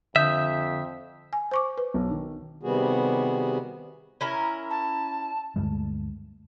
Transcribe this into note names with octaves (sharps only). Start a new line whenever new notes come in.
F2 D3 E5 D#6 G6
G#5
C5 C#6 D6
B4
B1
D#3
C3 D#3 G3 B3 F#4 G#4
C#4 E4 A#4
A5
D2 G2 G#3 A3